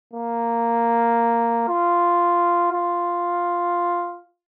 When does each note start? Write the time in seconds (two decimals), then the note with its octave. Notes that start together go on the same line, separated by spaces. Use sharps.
0.14 A#3
1.68 F4
2.72 F4